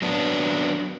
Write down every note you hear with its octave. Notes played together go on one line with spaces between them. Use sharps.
F#3 B3 D4